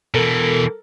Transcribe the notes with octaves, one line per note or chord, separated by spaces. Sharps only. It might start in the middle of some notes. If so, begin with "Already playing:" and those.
B2 E3 A4 A#4